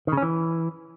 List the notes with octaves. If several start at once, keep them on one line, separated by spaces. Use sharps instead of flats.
D#3
C#3
C#4
E3